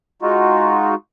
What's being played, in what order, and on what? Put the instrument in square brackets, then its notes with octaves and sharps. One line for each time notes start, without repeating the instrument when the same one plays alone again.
[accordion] G#3 D#4 F4 F#4